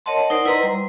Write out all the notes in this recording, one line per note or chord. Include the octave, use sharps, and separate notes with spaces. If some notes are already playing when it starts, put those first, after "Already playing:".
A#4 C#5 D#5 F#5 A5 C6
D#4 A#4 C5 D5 F#5
E4 B4 D#5 A#5 C6
G3